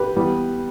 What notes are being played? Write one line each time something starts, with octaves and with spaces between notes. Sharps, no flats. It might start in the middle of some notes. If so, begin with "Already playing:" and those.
Already playing: G4 B4
E3 G3 B3